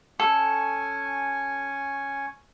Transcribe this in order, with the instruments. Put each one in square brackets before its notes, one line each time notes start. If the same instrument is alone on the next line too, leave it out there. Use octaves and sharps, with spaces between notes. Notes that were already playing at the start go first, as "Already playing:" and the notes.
[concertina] C#4 G#5 C#6 [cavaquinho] A4